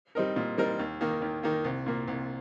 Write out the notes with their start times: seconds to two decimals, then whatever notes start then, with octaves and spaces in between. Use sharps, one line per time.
0.15 G3 C4 D#4 A#4
0.36 A#2
0.58 G3 C4 D#4 A#4
0.79 D#2
1.01 D#3 A#3
1.22 D#2
1.43 D#3 A#3
1.64 C2
1.86 A#2 A#3
2.08 C2